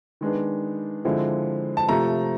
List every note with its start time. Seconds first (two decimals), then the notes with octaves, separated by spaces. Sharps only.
0.21 D#3 G#3 B3 D4
1.05 D3 F3 G#3 C4 E4
1.77 A5
1.89 C3 F3 A3 A#5